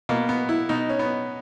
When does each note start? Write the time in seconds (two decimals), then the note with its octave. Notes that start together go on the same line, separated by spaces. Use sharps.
0.09 B2 A#3
0.29 B3
0.49 E4
0.69 B2 D#4
0.89 C#4
0.99 B3